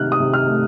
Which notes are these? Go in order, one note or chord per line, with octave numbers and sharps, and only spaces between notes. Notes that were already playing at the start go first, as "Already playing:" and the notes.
Already playing: C3 D#3 A3 F6 F#6
D#6
C3
F6
A3